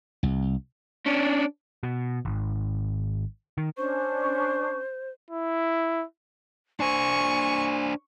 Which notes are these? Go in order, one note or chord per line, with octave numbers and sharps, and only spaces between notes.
C2
C#4 D4
B2
G#1
D#3
C#4 D4 C5 C#6
E4
D4 C5 G#5 C#6